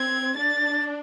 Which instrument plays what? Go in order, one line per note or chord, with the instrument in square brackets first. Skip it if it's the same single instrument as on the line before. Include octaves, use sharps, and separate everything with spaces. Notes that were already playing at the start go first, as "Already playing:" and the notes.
Already playing: [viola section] C4 [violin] G#6
[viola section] D4 [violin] A6